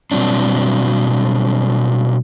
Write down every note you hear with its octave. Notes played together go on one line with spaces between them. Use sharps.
B2 F#3 G3 C4 D4